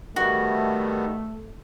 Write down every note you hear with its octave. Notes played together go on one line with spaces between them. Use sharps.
D#3 G3 A3 B3 F#4